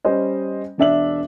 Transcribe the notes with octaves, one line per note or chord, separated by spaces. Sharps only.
G3 C#4 C5 D#5
E1 D4 E5 F#7